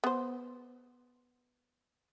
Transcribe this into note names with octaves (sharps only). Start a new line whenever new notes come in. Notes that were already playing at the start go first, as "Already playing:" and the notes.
B3 C5